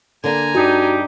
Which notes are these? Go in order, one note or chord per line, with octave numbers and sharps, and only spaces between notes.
D3 A#3 D4 G#5 A#5
G2 D4 D#4 F#4 G4